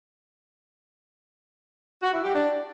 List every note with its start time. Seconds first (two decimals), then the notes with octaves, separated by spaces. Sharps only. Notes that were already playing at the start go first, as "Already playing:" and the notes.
2.03 F#4
2.13 E4
2.24 G4
2.35 D4